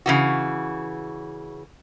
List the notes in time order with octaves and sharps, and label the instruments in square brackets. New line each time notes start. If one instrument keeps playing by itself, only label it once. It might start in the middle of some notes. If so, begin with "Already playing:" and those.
[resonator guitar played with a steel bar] C#3 E3 F#4